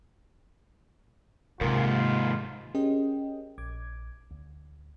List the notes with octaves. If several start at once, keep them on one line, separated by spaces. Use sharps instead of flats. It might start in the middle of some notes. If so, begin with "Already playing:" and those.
D#2 G#2 C3 A#3 F4
C#4 G4 G#4 A#4 D#5 G5
A#1 D6 G#6
D2